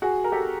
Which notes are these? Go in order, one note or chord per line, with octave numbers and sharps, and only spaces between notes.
F#4 G#4
A#4
G4 A4